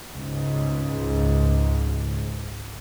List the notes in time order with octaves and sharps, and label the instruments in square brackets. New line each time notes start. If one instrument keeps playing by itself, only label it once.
[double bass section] C#2 G#2